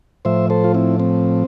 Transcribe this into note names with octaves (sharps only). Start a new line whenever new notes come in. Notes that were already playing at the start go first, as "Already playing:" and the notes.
A2 F3 C5 E5
A4 C5
F4
C4 E4
C4